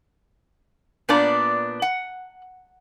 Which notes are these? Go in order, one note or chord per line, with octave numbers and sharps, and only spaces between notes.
A#2 B3 D4 D5 A#5
F#5